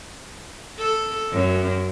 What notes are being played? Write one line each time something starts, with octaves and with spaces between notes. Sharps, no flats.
A4
F#2